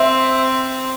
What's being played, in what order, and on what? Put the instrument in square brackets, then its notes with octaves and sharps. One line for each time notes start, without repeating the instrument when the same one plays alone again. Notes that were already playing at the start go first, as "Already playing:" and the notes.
Already playing: [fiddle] C4 [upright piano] E5